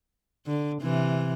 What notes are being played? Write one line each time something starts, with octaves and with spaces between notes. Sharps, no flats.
D3
C3 E3